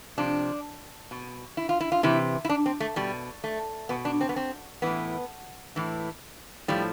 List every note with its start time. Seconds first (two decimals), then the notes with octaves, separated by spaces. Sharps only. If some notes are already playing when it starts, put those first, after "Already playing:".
0.18 C3 F3 D4
1.11 B2
1.57 E4
1.69 F4
1.81 E4
1.92 F4
2.03 C3 E3 E4
2.45 E4
2.49 D4
2.66 C4
2.80 A3
2.96 B2 G3
3.44 A3
3.89 B2 B3
4.05 D4
4.21 C4
4.29 B3
4.36 C4
4.82 A2 E3 B3
5.76 A2 E3
6.68 A2 F3 G3